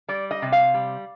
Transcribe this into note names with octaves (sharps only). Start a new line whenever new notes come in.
G3 D5
D#5
C3
F5
G3